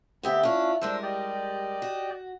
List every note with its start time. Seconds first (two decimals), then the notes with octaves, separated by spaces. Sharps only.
0.23 D2 B3 C4 G4 E5
0.43 C#4 D4 E4 F4
0.82 G3 G#3 D4 A#4 C5 E6
1.03 G4 D5 D#5
1.82 F#4